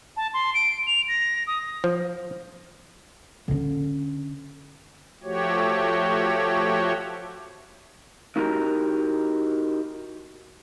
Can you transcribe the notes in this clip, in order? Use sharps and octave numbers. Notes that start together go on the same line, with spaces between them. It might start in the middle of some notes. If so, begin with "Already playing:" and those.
A5
C6
D7
F7
A#6
D#6
F3
D3 C#4
F3 A3 F#4 G4 C#5
D#4 E4 F#4 G4 A#4